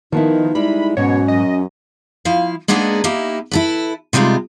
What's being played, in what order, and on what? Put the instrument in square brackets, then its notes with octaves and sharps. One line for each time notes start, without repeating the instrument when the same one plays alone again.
[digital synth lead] D#3 [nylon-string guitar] F3 B3 E4 [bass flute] D#4
[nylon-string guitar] G3 G#3 [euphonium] E4 [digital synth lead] B5
[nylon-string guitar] G#2 F#3 [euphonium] B2 [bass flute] C#4 [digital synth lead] C#5
[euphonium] F#2 [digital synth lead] D#5
[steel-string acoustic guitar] F3 E4 F5
G#3 A#3 B3 D4 D#4 G#4
A#3 D#4 E4 G4
E4 A4 B4
C3 G3 G#3 D#4 F4